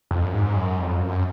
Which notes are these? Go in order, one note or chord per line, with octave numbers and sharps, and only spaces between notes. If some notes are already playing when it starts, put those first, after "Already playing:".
F2
F#2
G#2
F#2
F2
F#2